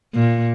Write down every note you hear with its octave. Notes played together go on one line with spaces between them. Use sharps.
A#2